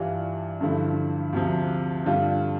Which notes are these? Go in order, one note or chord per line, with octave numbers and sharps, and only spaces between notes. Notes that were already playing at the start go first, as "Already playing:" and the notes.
Already playing: G2 E3 G3 D4 F4
G2 D3 F3 A3 E4
D2 C3 F3
G2 D3 G3 D4 F4